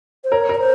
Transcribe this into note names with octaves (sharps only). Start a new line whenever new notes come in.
C5
A#4 C#5
A#4 C#5
C5